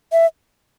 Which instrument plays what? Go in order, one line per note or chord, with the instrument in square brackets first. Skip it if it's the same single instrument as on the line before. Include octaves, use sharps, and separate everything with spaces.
[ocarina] E5